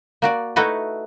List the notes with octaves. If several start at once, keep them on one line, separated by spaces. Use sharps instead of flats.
A#3 F#4 D5
A3 D#4 E4 F#4 A4 B4